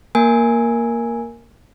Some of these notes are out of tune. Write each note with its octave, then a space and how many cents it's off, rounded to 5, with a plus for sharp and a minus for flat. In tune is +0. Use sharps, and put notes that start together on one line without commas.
A#3 +0 A#4 +0 G#5 +0